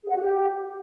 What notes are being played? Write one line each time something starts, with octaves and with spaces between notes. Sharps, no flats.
G#4
F#5
F#4
G4